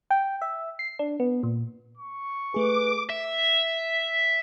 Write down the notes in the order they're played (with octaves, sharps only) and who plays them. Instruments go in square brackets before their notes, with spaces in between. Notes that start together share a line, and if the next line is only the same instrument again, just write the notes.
[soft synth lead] G5
E5
C7
D4
B3
A#2
[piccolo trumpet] C#6
[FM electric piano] A3 G#4 [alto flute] B4 [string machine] D6
[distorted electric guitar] E5